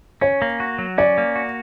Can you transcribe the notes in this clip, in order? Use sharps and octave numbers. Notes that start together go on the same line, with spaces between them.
C#4 C#5
A#3
F#4
F#3
C#4 D5
A#3
F#4